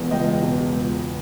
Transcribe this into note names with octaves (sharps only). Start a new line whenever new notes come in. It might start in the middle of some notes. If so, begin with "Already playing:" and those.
Already playing: E1 E2
C#2 D#5 G5
B2
C#2